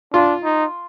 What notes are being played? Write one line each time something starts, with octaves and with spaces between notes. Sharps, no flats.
D4 F4
D#4